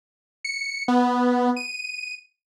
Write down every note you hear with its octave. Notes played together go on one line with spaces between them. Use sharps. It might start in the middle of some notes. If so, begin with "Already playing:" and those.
C#7
B3
D#7